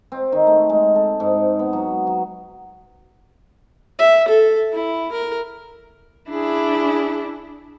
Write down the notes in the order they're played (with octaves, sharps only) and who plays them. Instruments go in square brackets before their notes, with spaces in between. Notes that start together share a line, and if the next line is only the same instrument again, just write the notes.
[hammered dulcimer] C4
D#3
A3
G#3
A4
G#2
B3
F#3
F#3
[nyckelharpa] E5
A4
E4
A#4
[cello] D4 E4 [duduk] G#4